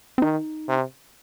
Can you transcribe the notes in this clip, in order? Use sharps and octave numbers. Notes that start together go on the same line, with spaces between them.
C4
D#3 D#4
C3